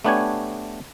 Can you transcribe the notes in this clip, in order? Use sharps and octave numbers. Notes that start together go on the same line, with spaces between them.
A3 B3 D4 G4 C#5 G#5